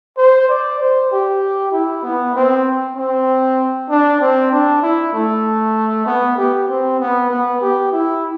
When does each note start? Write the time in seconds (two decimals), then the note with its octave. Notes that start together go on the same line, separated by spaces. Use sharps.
0.17 C5
0.49 D5
0.80 C5
1.11 G4
1.72 E4
2.03 B3
2.35 C4
2.96 C4
3.89 D4
4.21 C4
4.51 D4
4.82 E4
5.13 A3
6.06 B3
6.37 G4
6.68 C4
6.99 B3
7.31 B3
7.61 G4
7.92 E4